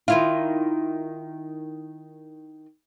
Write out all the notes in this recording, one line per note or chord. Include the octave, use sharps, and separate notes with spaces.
D#3 E4 F4